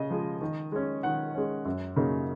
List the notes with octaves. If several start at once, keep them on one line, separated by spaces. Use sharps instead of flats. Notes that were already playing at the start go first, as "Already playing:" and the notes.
Already playing: C#3 D#5
F3 G#3
D#3
G#3 C#4
D#3 F#5
G#3 C#4
F#2
C#3 F#3 A#3 D#4